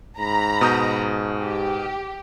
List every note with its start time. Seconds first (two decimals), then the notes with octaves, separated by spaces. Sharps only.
0.19 G#2 A#5 B5
0.61 B2 D#6 G6
1.41 G4